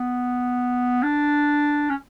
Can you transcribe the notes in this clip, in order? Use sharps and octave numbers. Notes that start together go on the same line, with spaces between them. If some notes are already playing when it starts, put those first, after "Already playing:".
Already playing: B3
D4
C#4